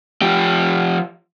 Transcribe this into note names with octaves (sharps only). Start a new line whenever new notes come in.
F3 G4